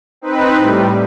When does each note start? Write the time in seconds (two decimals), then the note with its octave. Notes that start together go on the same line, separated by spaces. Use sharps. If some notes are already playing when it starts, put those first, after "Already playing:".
0.21 C4 D#4 B4
0.57 A2 G3